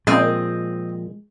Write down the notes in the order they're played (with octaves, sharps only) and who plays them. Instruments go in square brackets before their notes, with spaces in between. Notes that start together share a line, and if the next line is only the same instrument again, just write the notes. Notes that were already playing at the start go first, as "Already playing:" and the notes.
[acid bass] A#2 [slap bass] F3 [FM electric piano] G#3 [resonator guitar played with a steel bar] C4 D#5